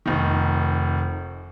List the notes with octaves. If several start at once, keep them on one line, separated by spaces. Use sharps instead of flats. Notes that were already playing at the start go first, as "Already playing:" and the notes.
F1 D#3